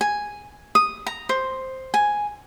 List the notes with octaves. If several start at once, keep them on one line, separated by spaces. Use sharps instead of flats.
G#5
D#6
A#5
C5
G#5